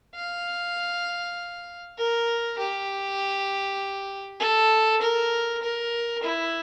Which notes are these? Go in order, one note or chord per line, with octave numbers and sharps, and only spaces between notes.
F5
A#4
G4
A4
A#4
A#4
E4